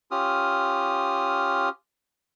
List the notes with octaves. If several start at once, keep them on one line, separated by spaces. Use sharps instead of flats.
C#4 F4 G4 D#6 F6